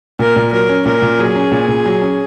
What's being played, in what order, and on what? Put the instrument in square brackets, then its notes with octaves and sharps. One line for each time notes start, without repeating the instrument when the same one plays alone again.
[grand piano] A#2 [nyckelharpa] A#4
[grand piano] A#2
[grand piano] F#3 [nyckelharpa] A#4
[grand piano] C#4
[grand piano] A#2 [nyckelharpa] A#4
[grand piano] A#2
[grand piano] F#3 [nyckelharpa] G#4
[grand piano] C#4
A#2
A#2
F#3
C#4